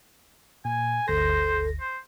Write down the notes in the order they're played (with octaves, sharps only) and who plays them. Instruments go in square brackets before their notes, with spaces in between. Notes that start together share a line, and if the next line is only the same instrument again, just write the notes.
[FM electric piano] A#2 [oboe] G#5
[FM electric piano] G1 D2 A#6 [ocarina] A4 [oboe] C5
[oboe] C5